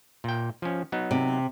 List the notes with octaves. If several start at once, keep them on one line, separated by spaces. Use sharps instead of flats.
A#2 G5
F3 C#4
F#3 B3 D#4
C3